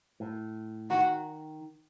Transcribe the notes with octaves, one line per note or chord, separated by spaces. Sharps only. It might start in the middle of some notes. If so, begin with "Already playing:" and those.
A2
D#3 F#4